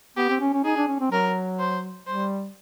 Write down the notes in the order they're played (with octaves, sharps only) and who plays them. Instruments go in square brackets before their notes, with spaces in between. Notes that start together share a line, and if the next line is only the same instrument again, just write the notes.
[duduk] B3 [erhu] G4
[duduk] C4
C#4
C#4
[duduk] D#4 [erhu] G#4
[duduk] D4
C#4
C4
[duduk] F#3 [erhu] A#4
[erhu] C5
[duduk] G3 [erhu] C5